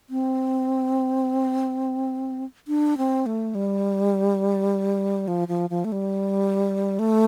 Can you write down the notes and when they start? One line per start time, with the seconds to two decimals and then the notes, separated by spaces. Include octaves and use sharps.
0.10 C4
2.68 D4
2.98 C4
3.26 A3
3.55 G3
5.28 F3
5.48 F3
5.70 F3
5.85 A3
5.92 G3
6.99 A3